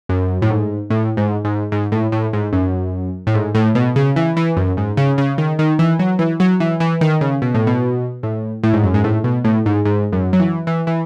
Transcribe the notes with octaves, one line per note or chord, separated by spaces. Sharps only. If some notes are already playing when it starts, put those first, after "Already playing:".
F#2
A2
G#2
A2
G#2
G#2
G#2
A2
A2
G#2
F#2
A2
G#2
A2
B2
C#3
E3
E3
F#2
G#2
C#3
C#3
D#3
D#3
E3
F#3
E3
F#3
E3
E3
D#3
C#3
B2
A2
B2
A2
A2
G#2
F#2
G#2
A2
B2
A2
G#2
G#2
F#2
F#3
E3
E3
E3